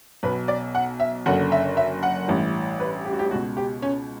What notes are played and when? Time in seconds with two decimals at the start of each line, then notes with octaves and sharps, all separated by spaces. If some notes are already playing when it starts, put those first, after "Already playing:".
0.23 B1 B2 B4
0.48 D5
0.75 F#5
1.00 E5
1.26 F#1 F#2 D3 F#5
1.52 E5
1.77 E5
2.03 F#5
2.28 A1 G2 E3
2.80 B4
3.05 G4
3.13 F#4
3.19 G4
3.31 C#2 F#4
3.34 B2
3.57 G4
3.82 C#4